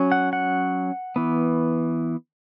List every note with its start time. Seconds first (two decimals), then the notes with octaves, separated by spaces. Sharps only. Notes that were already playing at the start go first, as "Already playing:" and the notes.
Already playing: F#3 C#4
0.12 F#5
0.33 F#5
1.16 E3 B3